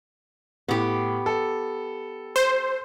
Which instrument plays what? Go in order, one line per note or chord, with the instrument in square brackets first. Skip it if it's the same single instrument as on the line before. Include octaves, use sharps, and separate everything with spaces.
[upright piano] A2 [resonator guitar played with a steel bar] B3 G4
[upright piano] A4
[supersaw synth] C5